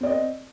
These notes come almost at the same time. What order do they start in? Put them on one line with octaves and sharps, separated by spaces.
C4 D5 D#5